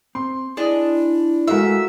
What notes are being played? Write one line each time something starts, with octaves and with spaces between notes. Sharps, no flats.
C4 C6
D4 E4 G#4 D#5
G#3 A3 F4 F#4 A#4 E5